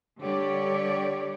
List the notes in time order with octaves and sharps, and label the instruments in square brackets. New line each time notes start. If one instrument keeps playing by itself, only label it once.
[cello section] D3 G3 G4 C#5 D5